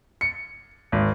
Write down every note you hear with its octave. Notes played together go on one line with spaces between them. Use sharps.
C#7
G#1